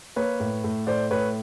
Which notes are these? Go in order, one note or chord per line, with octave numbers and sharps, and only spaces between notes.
A#3 B4 C#5
A2
A2
A2 C5 D5
A2 B4 C#5